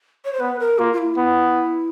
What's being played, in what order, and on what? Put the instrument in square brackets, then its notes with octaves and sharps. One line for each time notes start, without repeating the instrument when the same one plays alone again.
[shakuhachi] C#5
C5
[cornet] B3 [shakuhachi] B4
[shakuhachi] A#4
[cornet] A#3 [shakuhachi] F4
[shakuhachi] F4
E4
[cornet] B3